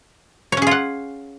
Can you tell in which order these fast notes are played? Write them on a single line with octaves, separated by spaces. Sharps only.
C#5 C#4 G#4 F4 F#5